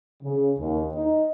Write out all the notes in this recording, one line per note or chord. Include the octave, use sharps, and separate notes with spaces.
C#3
D#2
D#4